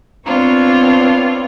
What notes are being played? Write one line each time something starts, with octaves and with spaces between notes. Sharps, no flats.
B3 C4 D4 F4 C#5